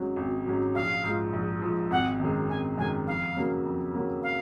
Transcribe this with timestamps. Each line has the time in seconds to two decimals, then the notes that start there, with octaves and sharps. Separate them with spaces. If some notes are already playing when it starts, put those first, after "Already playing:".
Already playing: G#1 G#2 F#3 C#4
0.16 G#1
0.46 G#2 F#3 C#4
0.75 A#1 F5
1.04 G#2 F3
1.33 A#1
1.62 G#2 F3
1.91 G#1 F#5
2.20 F#2 D#3 G#3
2.49 G#1 G#5
2.78 F#2 D#3 G#3 G#5
3.07 F2 F5
3.36 C#3 F#3 A#3
3.65 F2
3.94 C#3 F#3 A#3
4.23 F5